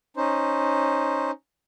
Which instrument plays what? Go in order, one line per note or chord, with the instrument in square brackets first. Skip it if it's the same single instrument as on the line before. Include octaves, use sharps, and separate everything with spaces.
[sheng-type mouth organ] C#4 D#4 C5